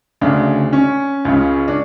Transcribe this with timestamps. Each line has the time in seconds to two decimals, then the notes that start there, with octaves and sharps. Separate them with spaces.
0.21 D2 C#3 D4
0.73 C#4
1.25 C#2 C#3
1.68 D4